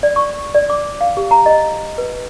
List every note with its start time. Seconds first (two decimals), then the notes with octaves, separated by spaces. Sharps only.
0.03 D5
0.16 C#6
0.55 D5
0.70 D6
1.01 F5
1.17 G4
1.31 A#5
1.46 D#5
1.98 B4